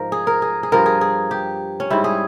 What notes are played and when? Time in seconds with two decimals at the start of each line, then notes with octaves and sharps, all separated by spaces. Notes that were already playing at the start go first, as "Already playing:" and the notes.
Already playing: G#2 F3 A#4
0.12 G#4
0.27 A#4
0.42 G#4
0.63 G#4
0.72 G2 F3 A#4
0.86 G#4
1.01 G#4
1.31 G4
1.80 C#4
1.90 G#2 G3 E4
2.04 G#4